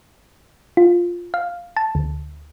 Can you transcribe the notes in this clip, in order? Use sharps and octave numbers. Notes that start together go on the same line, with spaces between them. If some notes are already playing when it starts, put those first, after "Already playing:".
F4
F5
A5
D2